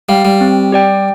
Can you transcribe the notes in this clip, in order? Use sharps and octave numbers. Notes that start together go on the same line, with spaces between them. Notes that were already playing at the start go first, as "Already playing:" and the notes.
G3 D5 F5
G3
C4
G4 D5 G5